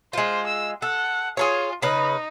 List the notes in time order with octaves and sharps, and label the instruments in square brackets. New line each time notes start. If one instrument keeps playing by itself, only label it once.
[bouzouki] G#3 F4 [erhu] C5
[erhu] E6
[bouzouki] A4 [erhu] F#5
[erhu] F4 [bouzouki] G#4 A4 C#5
[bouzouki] C#3 B4 [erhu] D#4